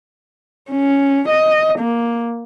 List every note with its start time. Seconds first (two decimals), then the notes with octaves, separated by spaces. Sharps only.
0.71 C#4
1.29 D#5
1.79 A#3